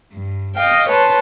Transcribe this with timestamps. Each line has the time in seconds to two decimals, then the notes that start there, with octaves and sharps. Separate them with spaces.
0.13 G2
0.55 D#5 F5 G5
0.89 B4 C#5 A5 C6